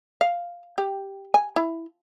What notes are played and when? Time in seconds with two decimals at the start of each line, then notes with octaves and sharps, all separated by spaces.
0.21 F5
0.78 G4
1.34 G#5
1.56 E4